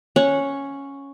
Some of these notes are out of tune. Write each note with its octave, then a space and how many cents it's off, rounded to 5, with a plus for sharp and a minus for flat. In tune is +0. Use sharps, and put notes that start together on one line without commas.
C#4 +0 C#5 +0 F#5 -15